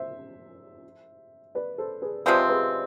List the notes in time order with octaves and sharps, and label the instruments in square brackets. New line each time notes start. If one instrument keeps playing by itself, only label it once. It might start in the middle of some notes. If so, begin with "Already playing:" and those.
Already playing: [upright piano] C5 E5
B4 D5
A4 C5
G#4 B4
[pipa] C3 F3 G#3 C4 [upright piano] B4 D5
[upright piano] G#4 B4